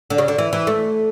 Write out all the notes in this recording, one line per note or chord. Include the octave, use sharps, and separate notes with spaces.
D3
C#3
D3
E3
E3
A3